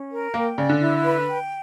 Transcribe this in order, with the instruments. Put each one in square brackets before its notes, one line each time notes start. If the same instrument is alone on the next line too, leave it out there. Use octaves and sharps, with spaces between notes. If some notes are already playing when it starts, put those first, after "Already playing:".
Already playing: [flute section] C#4
A#4
[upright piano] A#3 [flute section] G5
[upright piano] C#3 [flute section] D5
[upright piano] D3
[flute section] E4
B4
G5